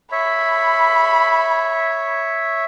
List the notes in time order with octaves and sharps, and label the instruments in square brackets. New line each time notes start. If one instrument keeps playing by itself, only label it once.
[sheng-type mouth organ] C#5 E5 [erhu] B5